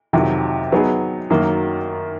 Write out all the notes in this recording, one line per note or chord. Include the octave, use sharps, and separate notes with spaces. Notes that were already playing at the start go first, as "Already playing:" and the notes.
F2 C3 D#3 F#3
F#3 B3 D#4 G#4
F#2 D#3 F#3 A#3